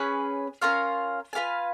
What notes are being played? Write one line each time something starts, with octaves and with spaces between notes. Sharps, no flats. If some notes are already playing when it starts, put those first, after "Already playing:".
Already playing: C#4 G#4 B4
C#4 F4 A#4 F5
F4 B4 F5 G#5